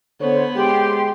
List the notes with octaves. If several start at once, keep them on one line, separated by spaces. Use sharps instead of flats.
D3 B3 C5 C#5
G#3 G4 G5 C6